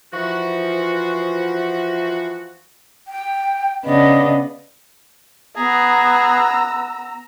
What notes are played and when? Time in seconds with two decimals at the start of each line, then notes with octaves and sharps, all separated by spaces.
0.13 E3 F3 F#4
3.08 G5
3.85 C#3 B3 D4 D#5
5.57 B3 G#4 A#5 E6